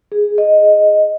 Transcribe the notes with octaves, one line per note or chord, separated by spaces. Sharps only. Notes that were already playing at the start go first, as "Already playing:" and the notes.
G#4
D#5